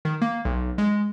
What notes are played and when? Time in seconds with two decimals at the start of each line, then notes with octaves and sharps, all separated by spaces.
0.05 D#3
0.22 A#3
0.45 B1
0.78 G#3